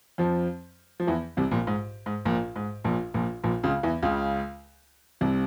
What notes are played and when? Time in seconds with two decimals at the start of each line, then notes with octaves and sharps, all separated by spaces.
0.18 F2 F3
1.00 F3
1.07 E2 E3
1.37 C2 C3
1.51 A#1 A#2
1.67 G#2
2.06 G#2
2.25 A#1 A#2
2.56 G#2
2.84 A#1 A#2
3.14 A#1 A#2
3.44 A#1 A#2
3.64 C#2 C#3
3.83 E2 E3
4.03 C#2 C#3
5.21 C2 C3